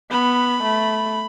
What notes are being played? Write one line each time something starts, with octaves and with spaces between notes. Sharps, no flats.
B3 B5
A3